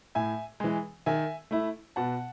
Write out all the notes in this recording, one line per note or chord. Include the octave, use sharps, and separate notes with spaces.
A2 E5 G#5
E3 G#3
D#3 E5 G#5
A3 E4
B2 F#5 A5